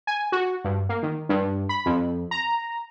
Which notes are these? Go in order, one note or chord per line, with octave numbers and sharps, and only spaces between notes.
G#5
F#4
G2
A#3
D#3
G2
B5
F2
A#5